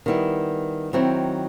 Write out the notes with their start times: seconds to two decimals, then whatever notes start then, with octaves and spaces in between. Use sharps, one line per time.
0.06 D#3 G3 B3 E4
0.93 D#3 F#3 C4 E4